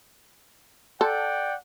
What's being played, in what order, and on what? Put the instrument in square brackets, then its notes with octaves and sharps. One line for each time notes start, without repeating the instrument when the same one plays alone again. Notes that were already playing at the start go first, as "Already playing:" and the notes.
[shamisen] A4 [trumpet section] D5 F#5 G5